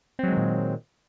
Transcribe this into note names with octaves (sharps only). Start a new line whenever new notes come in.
A#2 D#3 F#3 G#3 C4